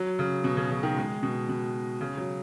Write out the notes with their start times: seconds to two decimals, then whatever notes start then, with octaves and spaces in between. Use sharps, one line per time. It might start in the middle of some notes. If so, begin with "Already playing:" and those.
Already playing: F#3
0.19 C#3
0.44 B2
0.57 C#3
0.71 C#3
0.83 D#3
0.97 G#3
1.23 B2
1.49 B2
2.01 C#3
2.17 F#3